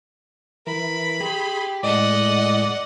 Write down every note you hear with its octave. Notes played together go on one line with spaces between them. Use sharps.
E3 A#4 B5
G4 G#4 C6
A2 G#3 D5 D#5 F#5